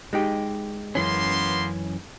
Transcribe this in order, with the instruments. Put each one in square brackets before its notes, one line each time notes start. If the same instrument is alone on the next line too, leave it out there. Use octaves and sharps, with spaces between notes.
[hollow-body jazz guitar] G#3 D#4 G4
[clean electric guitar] F#2 E3 C#4 [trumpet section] A#3 B3 C6